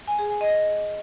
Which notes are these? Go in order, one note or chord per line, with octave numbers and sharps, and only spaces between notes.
G#5
G#4
G#5
D#5